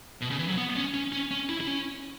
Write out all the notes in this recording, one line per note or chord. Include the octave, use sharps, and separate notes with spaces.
B2
C#3
E3
F#3
B3
C#4
C#4
C#4
C#4
E4
E4
C#4